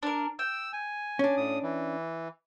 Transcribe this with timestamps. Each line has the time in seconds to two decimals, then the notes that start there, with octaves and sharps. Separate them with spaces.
0.03 D4 A#4
0.39 G5 E6
0.73 G#5
1.19 C#4 D4
1.37 A2 D#6
1.63 E3